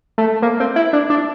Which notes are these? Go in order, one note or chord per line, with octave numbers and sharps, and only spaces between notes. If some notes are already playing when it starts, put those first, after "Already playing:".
A3
A#3
C4
E4
D4
D4